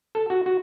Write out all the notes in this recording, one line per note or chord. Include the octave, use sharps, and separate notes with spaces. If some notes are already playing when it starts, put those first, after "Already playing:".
A4
F#4
F#4